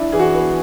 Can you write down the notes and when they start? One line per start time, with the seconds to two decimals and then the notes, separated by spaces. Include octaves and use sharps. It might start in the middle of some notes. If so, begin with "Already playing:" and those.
Already playing: D4 E4
0.12 E3 G#4
0.19 F#4
0.34 B3